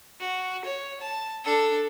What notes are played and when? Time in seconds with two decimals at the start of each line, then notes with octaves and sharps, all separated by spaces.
0.20 F#4
0.65 C#5
1.01 A5
1.45 D4 A4